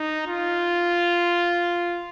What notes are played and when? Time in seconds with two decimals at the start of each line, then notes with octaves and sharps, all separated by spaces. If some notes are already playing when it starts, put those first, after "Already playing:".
Already playing: D#4
0.27 F4